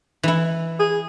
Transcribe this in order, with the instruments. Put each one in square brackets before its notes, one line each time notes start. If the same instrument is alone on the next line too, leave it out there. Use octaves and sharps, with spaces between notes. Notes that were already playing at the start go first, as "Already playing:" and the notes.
[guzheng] E3 E4
[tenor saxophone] G#4